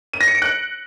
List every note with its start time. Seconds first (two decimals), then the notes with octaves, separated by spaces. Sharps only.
0.13 D#7
0.21 A#6
0.28 C#7
0.35 D7
0.42 F#6